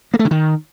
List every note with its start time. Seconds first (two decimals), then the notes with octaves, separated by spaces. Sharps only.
0.14 A#3
0.19 A3
0.25 D3
0.31 D#3